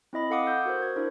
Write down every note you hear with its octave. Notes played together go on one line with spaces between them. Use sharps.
C4 E4 D#5 B5
A4 F5 F#5 D6 D#6
E6 G6
F#4 A#4 C5
G#6
D4 E4 A#4 C5